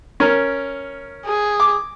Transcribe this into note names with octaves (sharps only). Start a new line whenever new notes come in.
C#4 A#4
G#4
D6